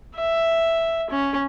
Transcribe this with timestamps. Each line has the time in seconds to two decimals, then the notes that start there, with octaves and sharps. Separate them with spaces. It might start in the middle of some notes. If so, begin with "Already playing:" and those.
0.15 E5
1.10 C#4